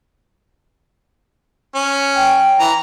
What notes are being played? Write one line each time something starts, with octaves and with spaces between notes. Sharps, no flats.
C#4
G5
E3 A#5